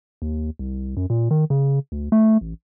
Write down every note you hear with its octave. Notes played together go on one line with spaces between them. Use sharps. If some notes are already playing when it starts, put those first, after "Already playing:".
D#2
C2
F#2
A#2
D#3
C#3
D2
A3
A1